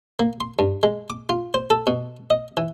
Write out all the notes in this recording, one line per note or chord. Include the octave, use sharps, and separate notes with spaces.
A#3
C6
G2
G#3
D6
F4
C5
A4
B2
D#5
E3